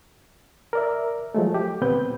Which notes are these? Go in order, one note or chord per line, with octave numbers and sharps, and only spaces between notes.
A#4 D5 E5
F3 F#3 G#3 A3
G4
D2 A#2 B3 C4 B4 G6